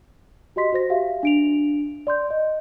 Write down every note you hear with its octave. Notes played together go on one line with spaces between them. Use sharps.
F#4 G4 D#5 C6 B6
F#4 C5 A#6
F#4 G4 E5 F5
D4 D7 F7
D5 C6 G6
D#5